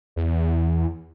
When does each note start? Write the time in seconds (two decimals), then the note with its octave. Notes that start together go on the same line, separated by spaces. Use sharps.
0.16 E2